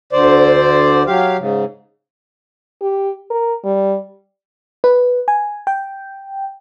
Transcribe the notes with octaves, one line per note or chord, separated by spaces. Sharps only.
D2 D3 C5 D5
F#3 G4 F5
G#2 C#3
G4
A#4
G3
B4
G#5
G5